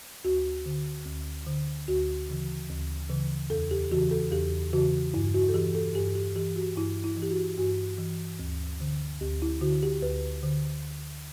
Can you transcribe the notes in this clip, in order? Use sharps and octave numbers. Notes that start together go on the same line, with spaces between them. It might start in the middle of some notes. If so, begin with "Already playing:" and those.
D2 F#4
D3
D2
D3
D2 F#4
C#3 E3
D2
C#3 E3
E2 A4
G4
C#3 E3 F#4
A4
E2 G4
C#3 E3 F#4
G2 E4
F#4
A4
E3 G4
A4
G2 G4
G4
E3 G4
F#4
G2 E4
E4
E3
G4
F#4
G2 F#4
E3
D2
D3
D2 G4
E4
D3 F#4
G4
D2 B4
D3